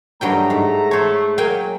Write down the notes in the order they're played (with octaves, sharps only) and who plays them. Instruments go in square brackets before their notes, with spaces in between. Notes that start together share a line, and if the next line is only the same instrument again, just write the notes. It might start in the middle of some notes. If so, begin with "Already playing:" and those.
[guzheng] G2 F#3 G5 [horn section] A3 A#5
[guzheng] G#2
[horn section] A3 [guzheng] C5 C#5
[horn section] F#3 [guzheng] A#3 G5 G#5